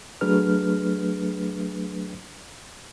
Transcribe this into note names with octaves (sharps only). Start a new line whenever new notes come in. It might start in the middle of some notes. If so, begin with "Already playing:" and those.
F#3 A3 D4 G#4 B4 F6